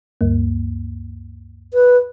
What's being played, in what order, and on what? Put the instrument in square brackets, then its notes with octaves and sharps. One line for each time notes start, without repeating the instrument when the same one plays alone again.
[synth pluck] D2 G2 A#3
[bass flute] B4